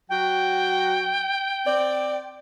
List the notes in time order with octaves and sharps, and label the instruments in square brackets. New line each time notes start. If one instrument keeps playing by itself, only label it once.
[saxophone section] F#3 F#4 [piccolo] G5
[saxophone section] C4 D5